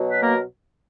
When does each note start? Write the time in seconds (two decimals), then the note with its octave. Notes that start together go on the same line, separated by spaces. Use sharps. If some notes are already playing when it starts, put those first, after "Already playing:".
Already playing: B2 F#3
0.10 B4
0.21 A#3 A#4